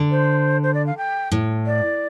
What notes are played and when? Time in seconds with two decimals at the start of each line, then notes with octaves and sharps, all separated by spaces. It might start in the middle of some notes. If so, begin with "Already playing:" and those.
Already playing: D3
0.11 C5
0.63 C5
0.74 D5
0.86 F5
0.97 G5
1.32 A2
1.66 D5